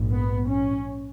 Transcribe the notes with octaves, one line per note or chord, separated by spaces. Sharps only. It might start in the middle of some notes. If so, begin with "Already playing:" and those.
Already playing: A#1 G#2
B3
C#4